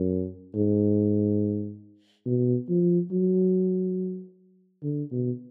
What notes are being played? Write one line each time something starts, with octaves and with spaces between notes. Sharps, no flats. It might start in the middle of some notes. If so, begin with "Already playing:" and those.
Already playing: F#2
G#2
B2
F3
F#3
D3
B2